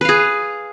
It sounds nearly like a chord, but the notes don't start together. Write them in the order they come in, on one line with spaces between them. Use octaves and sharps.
B4 F5 G#4